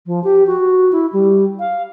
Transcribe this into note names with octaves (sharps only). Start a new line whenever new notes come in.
F3
G4
F#4
E4
G3
F5